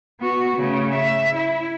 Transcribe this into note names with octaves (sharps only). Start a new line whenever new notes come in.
B3 F#4
C#3 A3
E5
E4